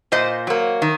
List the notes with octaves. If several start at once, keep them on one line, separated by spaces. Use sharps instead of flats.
A#2 C5 D#5
F#3 A#3
D#3